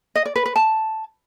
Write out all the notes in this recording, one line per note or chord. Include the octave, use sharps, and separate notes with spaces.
D#5
D5
B4
B4
A5